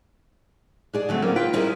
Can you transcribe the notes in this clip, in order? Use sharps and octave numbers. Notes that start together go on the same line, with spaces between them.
D4 G#4 D5
D3 F#3 A3 C4
A#3 C4 C#4 F4
F4 B4 G5
G3 C#4 E4 F4 G#4 A#4